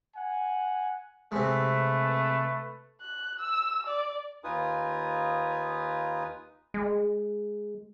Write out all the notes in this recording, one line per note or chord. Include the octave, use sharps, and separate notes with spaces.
F#5 G#5
C3 G#3 A3 B4
F#6
E6
D5
D#2 D#4 F4 B4 G#5 D#6
G#3